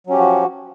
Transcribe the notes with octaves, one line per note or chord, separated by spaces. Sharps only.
F3 F#3 C#4 F#4 G4